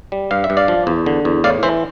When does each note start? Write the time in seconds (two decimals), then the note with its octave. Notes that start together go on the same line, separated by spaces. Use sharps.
0.12 G3
0.31 G2 F5
0.44 E5
0.50 G2
0.57 D5 F5
0.68 F3
0.87 E2
1.06 D3
1.25 E2
1.44 A2 D5 F5
1.63 E3 C5 E5